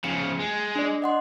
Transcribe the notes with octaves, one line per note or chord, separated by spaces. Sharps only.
C#3 F3 C#7
G#3
D4 D5
D#5 F#5 C6